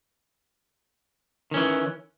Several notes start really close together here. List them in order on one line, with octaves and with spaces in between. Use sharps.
D#3 C#4 E3